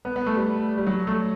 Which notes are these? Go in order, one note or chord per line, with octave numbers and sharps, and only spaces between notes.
B3
B3
A3
G3
G3
F#3
A3